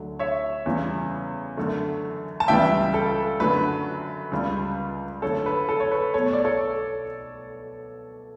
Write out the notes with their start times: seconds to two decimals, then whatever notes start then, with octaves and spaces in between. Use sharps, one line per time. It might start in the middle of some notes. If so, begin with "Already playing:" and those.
Already playing: D2 D3 F#3 A3
0.19 C#5 E5
0.66 E2 C#3 G3
1.57 F#2 D3 A3
2.40 A5
2.48 C#2 C#3 E3 G3 E5 G5
2.94 A4
3.40 F#2 D3 F#3 A3 B4
4.31 C#2 C#3 G3
5.22 F#2 D3 A3 A4 C#5
5.46 B4
5.69 A4
5.80 C#5
5.91 B4
6.14 B1 B2 A3 A4 C#5
6.33 D5
6.45 A4 C#5